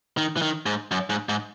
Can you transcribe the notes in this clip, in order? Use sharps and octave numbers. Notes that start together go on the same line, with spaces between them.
D#3
E3
D#3
G#2
F#2
G#2
G#2